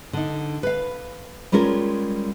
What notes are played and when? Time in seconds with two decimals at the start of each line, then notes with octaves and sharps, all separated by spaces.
0.13 D3 D#4
0.63 B4 F5
1.52 G3 G#3 C#4 F4 A#4